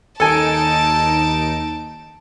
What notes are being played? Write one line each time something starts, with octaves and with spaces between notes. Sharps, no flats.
D#2 D#4 A4 G#5 A5 D7